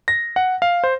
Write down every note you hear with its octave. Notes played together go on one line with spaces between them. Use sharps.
A#6
F#5
F5
C5